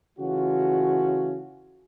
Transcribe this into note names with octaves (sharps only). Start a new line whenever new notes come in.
C#3 E3 A3 C#4 F4 F#4